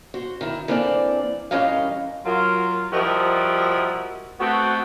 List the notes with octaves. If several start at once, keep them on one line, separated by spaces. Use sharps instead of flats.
F#4 C5
D#3 E4
E3 A#3 C4 D4 A4 D5
G2 E3 C#4 A#4 D#5 F5
F#3 F4 A#4
F3 G3 E4 F#4 A#4 D#5
A3 B3 C4 F#4